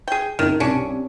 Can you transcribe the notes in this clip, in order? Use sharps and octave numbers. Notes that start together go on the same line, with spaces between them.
G#4 G5
F#1 D#3 D#4
C2 C#4 D4